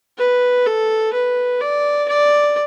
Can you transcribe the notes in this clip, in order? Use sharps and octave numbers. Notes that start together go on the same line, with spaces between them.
B4
A4
B4
D5
D5